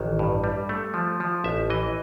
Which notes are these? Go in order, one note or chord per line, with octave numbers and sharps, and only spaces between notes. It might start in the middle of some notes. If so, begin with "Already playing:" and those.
Already playing: A1 D#3
G2
G3
A3
F3
F3
A1 E5
E3 D#5